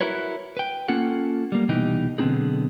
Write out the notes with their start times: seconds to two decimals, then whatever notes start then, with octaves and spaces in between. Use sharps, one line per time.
0.01 E4 F#4 A#4 B4 C#5
0.57 B4 G5
0.88 A#3 C#4 F4 A4 F#5
1.52 G3 A#3
1.69 C2 B2 E3 D#4 G4
2.18 B1 D3 B3 C4 D#4 G#4